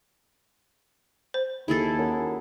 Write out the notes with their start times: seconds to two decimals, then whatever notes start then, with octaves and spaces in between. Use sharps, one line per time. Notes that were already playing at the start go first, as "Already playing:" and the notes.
1.34 C5
1.68 D#2 E4 G#4 A4
1.98 F#2